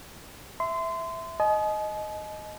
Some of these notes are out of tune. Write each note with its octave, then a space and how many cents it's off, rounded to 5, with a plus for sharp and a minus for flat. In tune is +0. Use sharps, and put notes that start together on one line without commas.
E5 +0 C6 -25
D#5 +0 G#5 +45